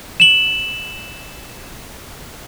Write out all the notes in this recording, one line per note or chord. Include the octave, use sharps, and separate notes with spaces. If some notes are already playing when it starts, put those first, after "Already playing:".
E7 F#7